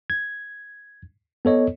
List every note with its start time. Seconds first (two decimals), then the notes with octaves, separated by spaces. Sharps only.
0.10 G#6
1.45 B3 A4 C#5 D#5